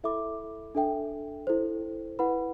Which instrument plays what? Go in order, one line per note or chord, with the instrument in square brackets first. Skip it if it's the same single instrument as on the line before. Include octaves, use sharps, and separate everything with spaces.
[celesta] E4 A4 E5 B5 D6
D4 A4 E5 G5
E4 A4 C5
E4 B4 F#5 B5